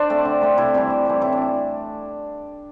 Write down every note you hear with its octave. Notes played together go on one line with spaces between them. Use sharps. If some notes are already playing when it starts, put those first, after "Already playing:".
Already playing: D4 C5 D5
A3 C4
D3
A3 C4
C3 E4
E3 G3 C4
C3
E3 G3 C4
A2 E4
D4